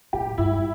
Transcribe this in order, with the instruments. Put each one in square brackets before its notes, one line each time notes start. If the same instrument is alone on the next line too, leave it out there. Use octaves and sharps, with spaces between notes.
[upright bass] A2 [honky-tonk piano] G4
[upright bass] G2 [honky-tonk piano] E4